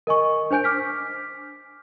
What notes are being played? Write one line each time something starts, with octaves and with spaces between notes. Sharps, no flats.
A#4 D#5 G#5 C#6
D4 C5 G#5 G6 D7
D6 F6 B6